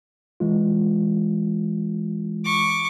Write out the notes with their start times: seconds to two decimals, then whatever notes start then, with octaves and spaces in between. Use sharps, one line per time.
0.40 E3 G#3 F4
2.44 C#6 D6